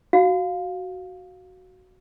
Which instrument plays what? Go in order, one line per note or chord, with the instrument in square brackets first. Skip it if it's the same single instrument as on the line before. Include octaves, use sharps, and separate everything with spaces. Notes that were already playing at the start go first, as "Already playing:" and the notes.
[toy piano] F#4 F5